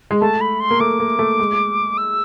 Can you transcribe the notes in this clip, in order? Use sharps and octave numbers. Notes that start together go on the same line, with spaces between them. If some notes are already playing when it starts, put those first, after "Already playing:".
G#3
A3 A5
B5
C6
A#3
A3 D6
A#3
A3
G#3
E6